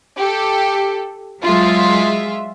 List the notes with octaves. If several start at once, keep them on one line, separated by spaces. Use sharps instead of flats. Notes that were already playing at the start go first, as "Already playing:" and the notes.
G4 A4
F#3 G#3 F4 E5